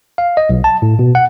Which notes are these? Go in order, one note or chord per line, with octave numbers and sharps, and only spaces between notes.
F5
D#5
B1
A5
A2
B2
F#5